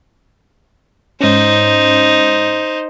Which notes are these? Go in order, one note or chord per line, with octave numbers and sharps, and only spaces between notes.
G#2 C#4 D#4 C5